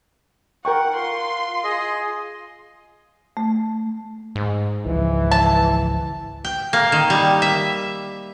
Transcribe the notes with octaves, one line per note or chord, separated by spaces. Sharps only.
A#4 F#5 G5 C#6
F4 C6
G#4 D#5
A3
G#2
G#1 C#2 E3 F3
A5
G5
A#3
D#3
G3
E5